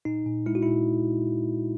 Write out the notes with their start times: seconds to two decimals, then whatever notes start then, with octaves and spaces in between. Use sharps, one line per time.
0.05 A#2 D#4
0.26 A#2
0.46 G#3 E4
0.55 F#4
0.63 A#2 E4